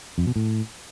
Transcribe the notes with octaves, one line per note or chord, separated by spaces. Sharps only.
F2
B2
A2